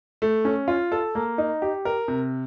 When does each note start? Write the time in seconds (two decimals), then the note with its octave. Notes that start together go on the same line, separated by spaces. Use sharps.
0.22 A3
0.45 C#4
0.68 F4
0.92 A4
1.15 A#3
1.38 D#4
1.62 G4
1.85 A#4
2.08 C3